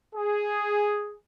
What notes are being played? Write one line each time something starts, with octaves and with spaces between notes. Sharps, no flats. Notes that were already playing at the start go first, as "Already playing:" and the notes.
G#4